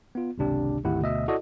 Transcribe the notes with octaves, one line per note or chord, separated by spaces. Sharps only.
B3 F4
G#1 C#2 C3 D4 G4
G#1 D2 E4 G4 F#5
D2 B2 D#5 E5
E4 F#4 A4 D5 D#5